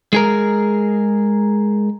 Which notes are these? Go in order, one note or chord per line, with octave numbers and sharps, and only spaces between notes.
G#3 G#4 A#4